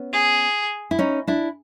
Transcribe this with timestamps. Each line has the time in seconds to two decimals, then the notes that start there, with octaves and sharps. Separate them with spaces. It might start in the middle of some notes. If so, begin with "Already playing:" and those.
Already playing: B3 C#4
0.13 G#4
0.91 E4
0.99 C#4 D#4
1.27 D4 E4